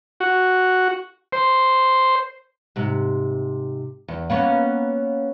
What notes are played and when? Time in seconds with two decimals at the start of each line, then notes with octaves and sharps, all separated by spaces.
0.20 F#4
1.32 C5
2.76 G#2 C3
4.08 E2
4.30 A#3 B3 C#4